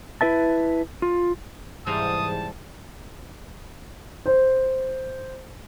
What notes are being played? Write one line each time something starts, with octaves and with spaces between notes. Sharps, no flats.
E4 B4 E5 A5
F4
G#2 C3 E3 G3 G#3 F5 A5 D#6
C5